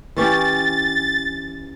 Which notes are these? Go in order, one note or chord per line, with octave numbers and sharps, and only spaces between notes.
E3 C#4 G4 A6